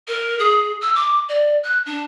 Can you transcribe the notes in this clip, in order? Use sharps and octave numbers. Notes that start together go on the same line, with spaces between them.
A#4
G#4
E6
D6
D5
F#6
D4